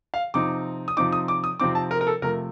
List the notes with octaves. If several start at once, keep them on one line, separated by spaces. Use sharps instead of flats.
F5
C3 F3 C4 D#4 D6
D#6
C3 F3 C4 D#4 D6
D#6
D6
D#6
C3 F3 C4 D#4 D6
A5
A#4
A#4
A4
C3 F3 A3 A#4